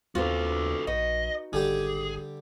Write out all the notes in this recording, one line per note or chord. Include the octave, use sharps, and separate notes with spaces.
D#2 B3 C4 F4 F#4 A4
A#1 D#4 F#4 B4 D#5
G#1 D3 G3 G4 G#4